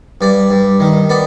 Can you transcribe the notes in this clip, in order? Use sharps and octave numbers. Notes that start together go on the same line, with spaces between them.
G2 D5
G2
D#3
B3 D5